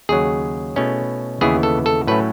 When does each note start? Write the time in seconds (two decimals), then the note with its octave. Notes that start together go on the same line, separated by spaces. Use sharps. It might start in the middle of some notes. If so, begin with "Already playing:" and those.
0.09 D#2 C#3 F#3 G#4
0.76 B2 A3 C#4 E4
1.41 D#2 C#3 E3 B3 E4 G#4
1.63 A4
1.86 A4
2.07 A2 F#3 A3 C#4 B4